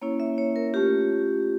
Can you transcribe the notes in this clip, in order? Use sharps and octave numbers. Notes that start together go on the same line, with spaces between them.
A#3 C#4 E4 C#5
E5
C#5
A#4
A3 C#4 F4 G4